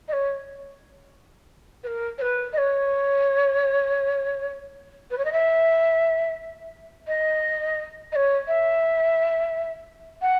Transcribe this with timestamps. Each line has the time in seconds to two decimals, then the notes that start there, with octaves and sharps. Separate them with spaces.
0.08 D#5
0.13 C#5
1.83 B4
1.87 A#4
2.18 C#5
2.21 B4
2.53 D#5
2.58 C#5
5.10 B4
5.18 C#5
5.25 D#5
5.32 E5
7.07 D#5
8.12 D#5
8.15 C#5
8.47 E5
10.22 F#5